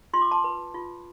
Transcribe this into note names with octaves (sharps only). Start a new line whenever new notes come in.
F4 C6
D6
A5 C6
B4
F4